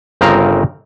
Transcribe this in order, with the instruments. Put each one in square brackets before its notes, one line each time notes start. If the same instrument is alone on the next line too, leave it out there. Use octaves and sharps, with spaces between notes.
[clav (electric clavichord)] G1 C#3 C4 A#4 F5 A#5